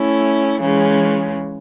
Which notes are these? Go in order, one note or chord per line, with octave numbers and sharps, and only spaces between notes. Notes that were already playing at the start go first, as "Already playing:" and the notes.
Already playing: A3 C#4 E4
C#3 E3 G#3 C#4